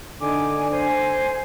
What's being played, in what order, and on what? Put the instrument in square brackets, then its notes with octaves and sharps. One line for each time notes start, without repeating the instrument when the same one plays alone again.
[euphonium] D3 [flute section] D#4 G#5 D6
[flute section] C5 G#5